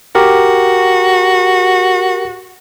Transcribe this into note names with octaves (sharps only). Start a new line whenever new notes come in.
F#4 G4 A#4